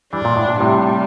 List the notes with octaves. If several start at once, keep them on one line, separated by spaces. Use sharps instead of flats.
E3 G3 D4
A#2
A2
A#2
A2 C3 G3